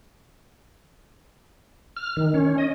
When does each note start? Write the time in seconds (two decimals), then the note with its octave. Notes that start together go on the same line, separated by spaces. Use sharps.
1.97 F6
2.17 D#3
2.34 C#4
2.58 D#5